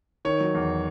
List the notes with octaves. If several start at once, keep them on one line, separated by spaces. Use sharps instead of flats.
D#3 C#5
F#3
E2